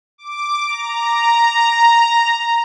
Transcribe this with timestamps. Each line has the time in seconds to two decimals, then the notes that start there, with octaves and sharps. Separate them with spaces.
0.18 D6
0.67 A#5